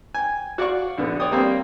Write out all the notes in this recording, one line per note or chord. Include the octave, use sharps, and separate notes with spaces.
G5 G#5
F#4 D5 F5 C#6
A#1 D3 B3
C#5 D5 G5 D#6
G3 A#3 C4